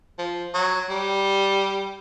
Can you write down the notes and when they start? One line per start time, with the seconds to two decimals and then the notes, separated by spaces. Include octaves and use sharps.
0.18 F3
0.54 F#3
0.90 G3